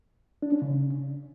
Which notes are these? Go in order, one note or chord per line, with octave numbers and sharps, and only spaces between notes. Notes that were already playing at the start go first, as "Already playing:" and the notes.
D4
C#4
C#3